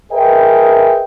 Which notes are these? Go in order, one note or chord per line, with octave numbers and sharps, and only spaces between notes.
G#4 A#4 B4 D#5 E5 G5